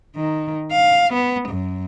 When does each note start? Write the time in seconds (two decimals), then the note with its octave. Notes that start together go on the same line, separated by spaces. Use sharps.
0.16 D#3
0.71 F5
1.13 B3
1.49 F#2